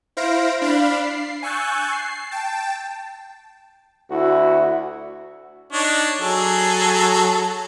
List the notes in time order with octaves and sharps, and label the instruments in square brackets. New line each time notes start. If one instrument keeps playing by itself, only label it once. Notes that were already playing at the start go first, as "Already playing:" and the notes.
[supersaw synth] E4 C5 F5 A#6 D7
D4 F5 B5
C7
G#5 C#6 E6 F#6 G6 A6
C7
G5 A5
[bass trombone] D2 [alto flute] E4 [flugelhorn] F#4
[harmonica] D4 D#4 C#5
F#3 G#4 A4